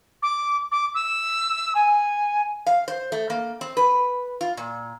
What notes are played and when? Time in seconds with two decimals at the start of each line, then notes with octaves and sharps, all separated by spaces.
0.23 D6
0.72 D6
0.95 E6
1.75 G#5
2.66 F5
2.88 C5
3.12 A3
3.30 A#3
3.61 C4
3.77 B4
4.41 F4
4.57 A#2